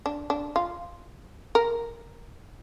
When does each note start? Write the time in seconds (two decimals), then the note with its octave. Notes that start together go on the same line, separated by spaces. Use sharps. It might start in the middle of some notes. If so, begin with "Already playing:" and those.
0.06 D4
0.30 D4
0.56 F4
1.55 A#4